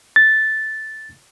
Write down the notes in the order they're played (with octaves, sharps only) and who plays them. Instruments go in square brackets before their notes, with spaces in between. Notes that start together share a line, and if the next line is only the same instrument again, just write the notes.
[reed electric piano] A6